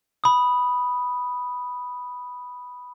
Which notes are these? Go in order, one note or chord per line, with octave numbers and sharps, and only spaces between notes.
B5 D#6